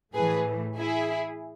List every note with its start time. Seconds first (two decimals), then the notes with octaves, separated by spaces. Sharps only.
0.14 A2 E3 A3 G#4 B4
0.78 E4 G#4